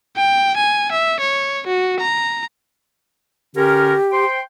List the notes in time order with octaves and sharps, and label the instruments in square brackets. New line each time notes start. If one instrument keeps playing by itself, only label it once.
[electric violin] G5
G#5
E5
C#5
F#4
A#5
[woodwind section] D3 C#4 A#4 [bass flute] G4
[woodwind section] C5 G5 C6